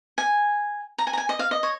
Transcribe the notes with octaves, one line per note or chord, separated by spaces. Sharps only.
G#5
A#5
G#5
A#5
G#5
D#5
F5
D#5
C#5